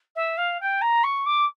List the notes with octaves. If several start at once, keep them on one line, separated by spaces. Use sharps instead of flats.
E5
F5
G5
A#5
C#6
D6